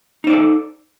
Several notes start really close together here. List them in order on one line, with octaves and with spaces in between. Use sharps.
D#4 C5 D5 A4